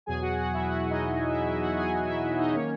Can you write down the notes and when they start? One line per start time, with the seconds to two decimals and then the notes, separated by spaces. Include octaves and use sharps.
0.06 E2 B2 F#3 G#4 G#5
0.22 F#4 F#5
0.38 F#4 F#5
0.54 E4 E5
0.69 F#4 F#5
0.89 D#4 D#5
1.30 E4 E5
1.46 E4 E5
1.61 F#4 F#5
1.77 G#4 G#5
2.07 E4 E5
2.39 D#4 D#5
2.54 D#3 F#3 A#3 C#4 C#5